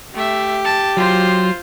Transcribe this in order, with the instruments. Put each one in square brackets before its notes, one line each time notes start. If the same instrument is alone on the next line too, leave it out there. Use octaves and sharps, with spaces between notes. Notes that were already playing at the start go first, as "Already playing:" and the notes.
[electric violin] A3 E5 [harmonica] G4
[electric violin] A5
[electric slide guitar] F#3 [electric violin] F4 C5